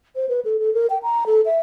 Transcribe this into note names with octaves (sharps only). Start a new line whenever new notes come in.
C5
B4
A4
A4
A#4
G5
A#5
A4
E5